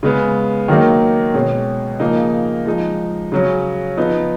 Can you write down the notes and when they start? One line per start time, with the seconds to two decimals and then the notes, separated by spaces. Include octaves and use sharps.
0.03 C#3 G#3 B3
0.68 D#3 F#3 A#3 D#4
1.34 B2 G#3 C#4
2.00 C#3 F3 A#3 D#4
2.66 F3 G#3 D#4
3.32 C#3 F#3 C#4
3.97 F3 B3 D#4